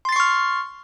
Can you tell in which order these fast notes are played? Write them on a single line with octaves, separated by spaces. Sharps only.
C6 A6 C7 C#6 F6